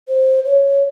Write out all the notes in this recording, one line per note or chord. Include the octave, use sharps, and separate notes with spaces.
C5
C#5